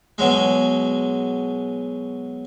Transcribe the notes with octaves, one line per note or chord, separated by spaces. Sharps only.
B2 F#3 G#3